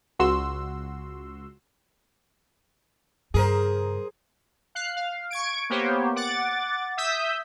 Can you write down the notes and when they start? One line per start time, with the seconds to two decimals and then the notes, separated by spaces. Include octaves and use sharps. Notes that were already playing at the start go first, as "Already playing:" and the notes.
0.19 C#2 F#4 C6 E6
3.34 G2 C#3 G#4 A#4 C5
4.75 F5 F#6 C7
4.96 F5
5.30 C#6 G#6 D7
5.70 A#3 B3 G4 C5 C#5
6.16 F#5 D6 A6
6.97 E5 D#6 E6 G6 B6